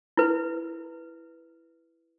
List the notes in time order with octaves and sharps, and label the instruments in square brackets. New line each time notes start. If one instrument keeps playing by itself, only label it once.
[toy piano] E4 B4